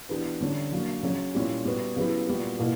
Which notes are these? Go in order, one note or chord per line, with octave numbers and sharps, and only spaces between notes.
E3 B3 D4 G4
D3 G3 C#4
F#3 A#3 D4 F#4
C#3 F#3 C#4
A#2 G3 C#4 E4 G4
G3 B3 F#4
C#3 F#3 B3 E4 G4
A#2 G3 B3 F#4
B2 A#3 E4